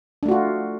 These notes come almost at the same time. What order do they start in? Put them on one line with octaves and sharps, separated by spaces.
D4 A3 F#4 F4